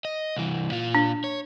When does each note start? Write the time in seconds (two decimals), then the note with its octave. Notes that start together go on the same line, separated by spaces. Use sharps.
0.05 D#5
0.36 C2 E3
0.71 A#2 F4
0.95 D4
1.24 C#5